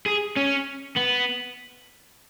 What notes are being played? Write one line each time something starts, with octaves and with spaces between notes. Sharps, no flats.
G#4
C#4
B3